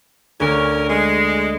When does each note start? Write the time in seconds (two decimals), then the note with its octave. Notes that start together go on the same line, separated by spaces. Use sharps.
0.40 D2 C#4 A#4 C#6 B6
0.90 G#3